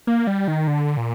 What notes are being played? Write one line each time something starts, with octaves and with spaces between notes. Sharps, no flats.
A#3
G3
D#3
D3
A#2